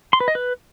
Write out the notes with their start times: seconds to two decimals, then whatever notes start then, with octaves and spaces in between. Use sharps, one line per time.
0.13 C6
0.20 B4
0.28 D#5
0.35 B4